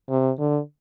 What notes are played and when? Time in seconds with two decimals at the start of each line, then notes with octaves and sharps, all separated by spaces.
0.10 C3
0.38 D3